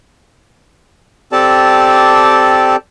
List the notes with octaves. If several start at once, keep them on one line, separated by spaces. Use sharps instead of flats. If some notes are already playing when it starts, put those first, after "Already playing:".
C4 G4 A4 D5 A5